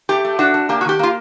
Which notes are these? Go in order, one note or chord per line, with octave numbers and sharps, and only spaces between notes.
A3 G4
A3
D4 F#4
D4
A#3 G4
F#4
D#3 G4
A#3 F4